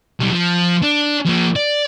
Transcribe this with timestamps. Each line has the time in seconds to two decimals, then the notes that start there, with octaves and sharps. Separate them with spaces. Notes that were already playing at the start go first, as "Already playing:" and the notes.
0.20 B1 G3
0.31 F3
0.82 D4
1.26 F3 A#3
1.56 D5